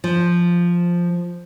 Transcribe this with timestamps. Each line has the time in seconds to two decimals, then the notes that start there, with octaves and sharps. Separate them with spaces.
0.04 F3